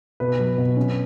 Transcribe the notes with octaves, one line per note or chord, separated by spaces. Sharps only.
B2 B4
F#3
B2
C#4